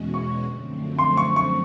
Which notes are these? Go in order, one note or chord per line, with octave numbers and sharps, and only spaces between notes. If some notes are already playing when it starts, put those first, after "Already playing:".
Already playing: E2 B2 G#3 C#4 F#4
C#6
F#2 D3 F3 A3 C4
C6
C#6
C#6